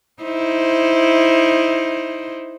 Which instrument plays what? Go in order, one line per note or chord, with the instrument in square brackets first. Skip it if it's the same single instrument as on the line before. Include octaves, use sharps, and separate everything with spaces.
[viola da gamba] D#4 E4 C5